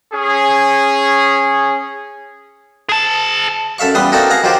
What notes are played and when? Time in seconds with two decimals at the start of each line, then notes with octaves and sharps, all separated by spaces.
0.13 C#4 G#4
2.89 G#4 A5
3.78 F#2 A4 E5 F5 C#6
3.95 E2 G3 B4 C6 D#6
4.12 A#3 C4 D#4 F#4 A4
4.30 G#4 F5 F#5 A#5
4.43 D#3 F#3 F4 G4 C5